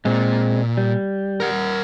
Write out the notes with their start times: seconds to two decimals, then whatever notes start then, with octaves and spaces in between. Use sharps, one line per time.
0.05 A#2 G#3 C4
0.77 G3
1.40 A#4 F#5